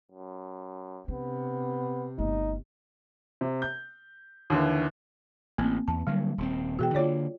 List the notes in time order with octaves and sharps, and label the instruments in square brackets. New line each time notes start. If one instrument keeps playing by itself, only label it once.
[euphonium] F#2
[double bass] C3 [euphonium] B3 [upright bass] D4
[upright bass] G1 A3 [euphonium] D#4
[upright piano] C3
G6
D#2 D3 E3
[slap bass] A1 [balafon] A#3 C4
[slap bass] E2 [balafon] A5
[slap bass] D3 F#3 A#3 [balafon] G3
[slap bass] D#1 G2 C4
[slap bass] B2 E3 [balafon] F#4 G#4 G5
[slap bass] D3 A#3 [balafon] F4 C#5 D5